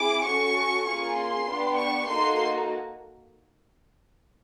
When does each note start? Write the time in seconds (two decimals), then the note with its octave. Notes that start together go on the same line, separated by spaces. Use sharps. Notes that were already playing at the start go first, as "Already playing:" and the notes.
Already playing: C4 E4 G#4 D6
0.26 C#4 F#4 A4 C#6
0.87 A#3 C#4 F4 G#4 C#6
1.18 C6
1.48 B3 D4 G4
1.78 C#6
2.09 A#3 D#4 F#4 A4 C6